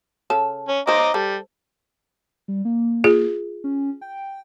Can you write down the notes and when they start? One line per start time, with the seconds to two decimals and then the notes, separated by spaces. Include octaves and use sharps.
0.30 C#3 A4 A5
0.68 C#4
0.87 G#4 C5 D#5 A#5 D6
1.14 G3 A4
2.48 G3
2.65 A#3
3.04 F4 G#4
3.64 C#4
4.01 G5